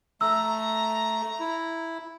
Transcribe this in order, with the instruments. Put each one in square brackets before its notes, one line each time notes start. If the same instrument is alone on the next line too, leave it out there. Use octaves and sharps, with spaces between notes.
[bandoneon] A3 [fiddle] A#5 [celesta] E6
[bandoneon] E4